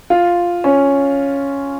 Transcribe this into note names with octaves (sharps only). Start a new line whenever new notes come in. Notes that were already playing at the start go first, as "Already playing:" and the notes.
F4
C#4